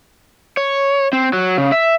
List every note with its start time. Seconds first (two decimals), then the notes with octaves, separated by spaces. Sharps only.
0.57 C#5
1.13 C4
1.33 F#3
1.58 C#3
1.72 E5